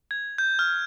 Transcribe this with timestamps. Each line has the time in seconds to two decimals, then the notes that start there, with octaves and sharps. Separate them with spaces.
0.11 G#6
0.38 G6
0.59 F6